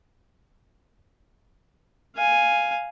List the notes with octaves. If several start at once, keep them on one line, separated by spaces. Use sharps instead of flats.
F5 G#5